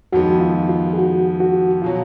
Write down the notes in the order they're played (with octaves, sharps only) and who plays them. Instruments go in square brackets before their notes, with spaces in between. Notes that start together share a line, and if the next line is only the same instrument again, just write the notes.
[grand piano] F2 D#3 G#3 B3 D#4 [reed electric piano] F#4
[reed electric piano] F4
F4
G#4
F#4
F#4
[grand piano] B2 F#3 [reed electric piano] F4